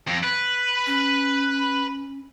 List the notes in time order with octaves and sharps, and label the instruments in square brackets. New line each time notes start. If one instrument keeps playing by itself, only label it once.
[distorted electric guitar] F2
B4
[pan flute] C#4